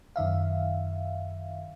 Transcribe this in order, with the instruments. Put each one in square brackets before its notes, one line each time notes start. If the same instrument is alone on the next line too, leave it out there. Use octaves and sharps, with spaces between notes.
[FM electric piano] F#2 D#3 E5 F5